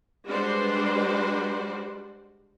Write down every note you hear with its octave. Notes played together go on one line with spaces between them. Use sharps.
G3 G#3 D4 F#4 B4 C5